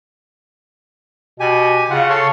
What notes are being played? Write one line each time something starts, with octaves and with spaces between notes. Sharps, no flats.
B2 G4 G#5
C#3 F4 F#5
A4 C#5 C6